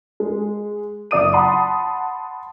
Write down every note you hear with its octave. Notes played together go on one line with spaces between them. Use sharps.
G#3
F#1 D5 D#6 D#7
F#5 A5 B5 C6 D#6